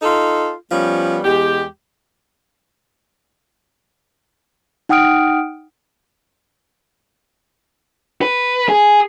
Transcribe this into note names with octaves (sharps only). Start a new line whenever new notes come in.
D#4 F4 A4
F3 G3 B3 C#4
E2 G#3 G4
D#4 F#5 G5 D#6 F6 D7
B4
G#4